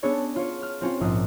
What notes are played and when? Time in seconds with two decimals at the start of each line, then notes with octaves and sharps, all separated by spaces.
0.03 B3 C#4 D4 G#4 A4 C#5
0.36 F4 C#5
0.62 F6
0.81 C4 C#4 F4
1.00 A#1 G#2 F4 D#6